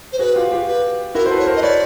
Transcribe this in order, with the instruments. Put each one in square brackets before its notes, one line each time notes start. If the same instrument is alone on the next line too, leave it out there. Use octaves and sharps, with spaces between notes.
[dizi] C5
[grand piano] F#4 G#4 [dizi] B4
[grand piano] F4 G4
F4 G4
[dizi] B4
[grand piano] E4 F#4 [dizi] A#4
[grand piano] C5
A4 B4
[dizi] C#5
[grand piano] A#4 C5
[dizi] D#5
[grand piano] B4 C#5 [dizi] D5